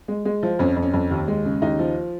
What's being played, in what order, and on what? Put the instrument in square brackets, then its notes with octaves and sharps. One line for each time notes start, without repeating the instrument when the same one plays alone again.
[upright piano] G#3
G#3
F3
F2 C#4
F2
C#4
F2
D#2
G#3
C#3
D#2 D#4
F3